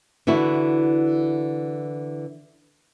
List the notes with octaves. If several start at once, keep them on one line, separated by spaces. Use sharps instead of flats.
D3 E3 E4 F#4